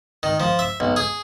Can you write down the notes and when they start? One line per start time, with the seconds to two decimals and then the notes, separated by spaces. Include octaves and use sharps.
0.23 D#3
0.40 F3
0.59 E5
0.80 B1
0.96 G#4